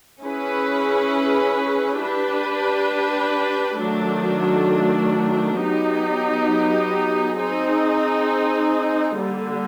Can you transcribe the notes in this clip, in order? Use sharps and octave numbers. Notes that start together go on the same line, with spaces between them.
C#4 E4 G#4 B4
D4 G4 B4
D#3 F#3 A3 D4
F#3 B3 D#4 G4
C4 D#4 G#4
D3 G3 A#3